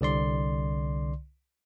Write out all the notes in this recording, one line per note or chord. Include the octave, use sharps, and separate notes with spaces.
C2 D3 D5 C6